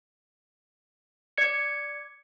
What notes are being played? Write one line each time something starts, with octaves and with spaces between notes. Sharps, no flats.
D5 G#6 C#7